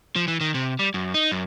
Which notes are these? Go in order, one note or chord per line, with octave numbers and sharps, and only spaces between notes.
F3
E3
D#3
C3
G3
F#2
D#4
F#2